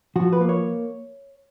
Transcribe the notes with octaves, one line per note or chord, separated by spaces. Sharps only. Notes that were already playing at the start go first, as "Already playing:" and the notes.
F3 F#4
B4
A#3
C#5